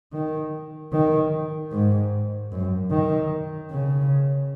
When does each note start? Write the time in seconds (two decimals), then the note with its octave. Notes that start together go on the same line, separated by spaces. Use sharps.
0.13 D#3
0.92 D#3
1.72 G#2
2.52 F#2
2.91 D#3
3.71 C#3